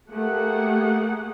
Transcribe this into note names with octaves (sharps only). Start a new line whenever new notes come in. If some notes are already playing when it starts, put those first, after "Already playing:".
A3 A#3 G4 G#4 F#5